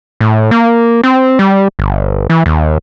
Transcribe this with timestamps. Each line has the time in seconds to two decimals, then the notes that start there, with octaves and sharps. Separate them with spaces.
0.20 A2
0.51 A#3
1.04 C4
1.39 G3
1.79 G1
2.30 E3
2.46 D#2